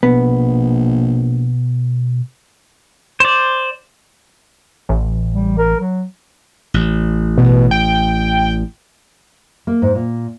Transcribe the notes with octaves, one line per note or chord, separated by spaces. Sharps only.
A#1 B2 B3
C5 D5
A1
G3
A#4
F#3
A1
B2
G5
A#3
G#2
A#2